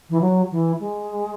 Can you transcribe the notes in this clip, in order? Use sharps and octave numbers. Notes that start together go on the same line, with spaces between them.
E3
F#3
E3
G#3